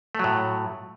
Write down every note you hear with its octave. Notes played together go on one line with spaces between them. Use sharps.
A2 F#3 A3